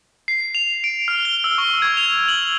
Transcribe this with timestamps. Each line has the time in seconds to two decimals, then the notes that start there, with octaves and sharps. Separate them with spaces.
0.28 C7
0.55 F7
0.84 D7
1.08 F6
1.25 G7
1.44 E6
1.58 C#6
1.82 G#6
1.97 F7
2.28 F#7